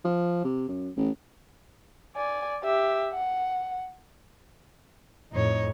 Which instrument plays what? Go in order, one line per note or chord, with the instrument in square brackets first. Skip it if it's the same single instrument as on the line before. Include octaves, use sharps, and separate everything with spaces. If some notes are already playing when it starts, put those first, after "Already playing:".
[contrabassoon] F3
C3
F#2
A1
[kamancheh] D5 G#5
G4 E5
F#5
[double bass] F2 A2 [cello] D#4 C#5